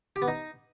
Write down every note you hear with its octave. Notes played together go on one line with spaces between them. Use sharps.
G4
B3
D#4